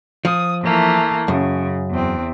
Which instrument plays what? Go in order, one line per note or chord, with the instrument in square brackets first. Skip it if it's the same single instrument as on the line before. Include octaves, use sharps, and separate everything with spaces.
[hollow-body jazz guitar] F3 [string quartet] D#6
[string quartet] E3 A3 A#3
[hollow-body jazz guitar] F#2 [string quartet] C#3
[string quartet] E2 C4